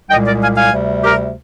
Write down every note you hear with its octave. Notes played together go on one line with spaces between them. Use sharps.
C2 A#2 G#3 D#5 G5
A#4 D5
F5 G#5
F5 G#5
D2 C3 G3
G4 A#4